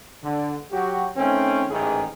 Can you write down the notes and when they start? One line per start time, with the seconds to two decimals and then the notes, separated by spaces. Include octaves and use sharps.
0.23 D3
0.71 F#3 F#4 G4
1.17 D#3 A3 C4 C#4
1.70 A1 G#2 D#3 E3 G#4